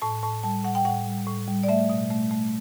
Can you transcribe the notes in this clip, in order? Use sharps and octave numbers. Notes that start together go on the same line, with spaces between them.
A2 A5
A2 A5
G3 A5
A2 F#5
G5
A2 F#5
G3
A2
G3
D5
A3 E5
B2
A3
A3